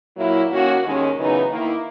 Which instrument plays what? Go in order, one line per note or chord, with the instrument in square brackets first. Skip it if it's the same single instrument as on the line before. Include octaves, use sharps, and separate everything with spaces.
[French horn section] A#2 F#3 A#3 E4
D#3 A#3 C#4 F#4
D#2 D#3 G#3 C#4
F#2 C#3 E3 B3 D#4
D#3 A#3 E4